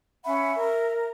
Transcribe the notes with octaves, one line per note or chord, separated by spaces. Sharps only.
C#4 E5 F#5 B5
A#4